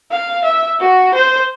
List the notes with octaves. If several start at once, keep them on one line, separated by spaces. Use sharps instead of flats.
F5
E5
F#4
C5